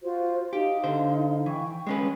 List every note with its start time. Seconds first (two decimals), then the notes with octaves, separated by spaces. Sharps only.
0.02 F4 F#4 C5
0.53 D#4 G4 F5
0.84 D3 C5
1.46 E3 G5 C#6
1.87 G#3 C#4 B4 G#5